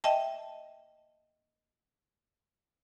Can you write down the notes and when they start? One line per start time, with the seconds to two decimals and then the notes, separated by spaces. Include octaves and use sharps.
0.04 D#5 E5 G5 A5